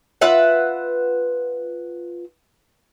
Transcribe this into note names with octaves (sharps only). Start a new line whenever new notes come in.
F4 B4 E5 F#5